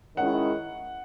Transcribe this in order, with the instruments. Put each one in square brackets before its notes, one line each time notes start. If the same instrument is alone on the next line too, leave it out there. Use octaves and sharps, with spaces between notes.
[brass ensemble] D#3 G#3 C#4 E4 [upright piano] F#5